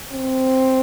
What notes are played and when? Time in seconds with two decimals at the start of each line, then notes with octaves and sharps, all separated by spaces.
0.12 C4